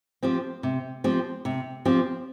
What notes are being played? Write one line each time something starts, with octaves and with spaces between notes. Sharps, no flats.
F3 C4 G4
C3
F3 C4 G4
C3
F3 C4 G4